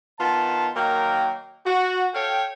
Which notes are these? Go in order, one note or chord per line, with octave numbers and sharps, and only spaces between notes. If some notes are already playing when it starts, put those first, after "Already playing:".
D#3 B3 F4 A5
D#3 F#3 A#3 A#4 G5
F#4
A4 C#5 F5 G5